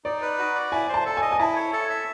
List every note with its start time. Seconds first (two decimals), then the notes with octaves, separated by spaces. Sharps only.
0.04 D#4 D5
0.22 B4
0.38 F#4
0.55 D5
0.72 E4 G#5
0.89 C5
0.94 A5
1.05 A4
1.17 D#5 G#5
1.32 G#5
1.39 E4 A5
1.56 C#5
1.73 A4
1.90 E5